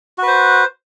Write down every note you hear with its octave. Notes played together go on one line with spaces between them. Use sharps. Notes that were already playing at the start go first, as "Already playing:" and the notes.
F#4 B4 C5